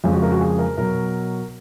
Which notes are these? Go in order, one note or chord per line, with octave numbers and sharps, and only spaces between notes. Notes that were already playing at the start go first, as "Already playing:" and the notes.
F2 C#3 F3 G#3 C#4
F#4
A#4
F#4
G#4
A#4
B2 F#3 A#4